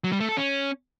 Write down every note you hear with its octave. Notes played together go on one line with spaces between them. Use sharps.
F#3
G3
A3
A4
C#4